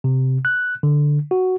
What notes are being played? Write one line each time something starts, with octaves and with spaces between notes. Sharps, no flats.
C3
F#6
D3
F#4